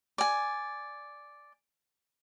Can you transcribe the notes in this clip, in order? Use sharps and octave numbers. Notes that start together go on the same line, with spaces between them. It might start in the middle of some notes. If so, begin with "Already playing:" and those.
D5 G#5